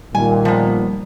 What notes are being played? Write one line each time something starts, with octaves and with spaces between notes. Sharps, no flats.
A#2 D#3 G3 G#5
F3 B3